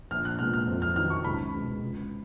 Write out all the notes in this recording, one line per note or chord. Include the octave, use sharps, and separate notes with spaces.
A#1 F6
F#6
A#2 G#3 B3 F6
F6
F2
F6
D#3 F#3 F6
C#6
C#2 B5
B2 G#3
C#2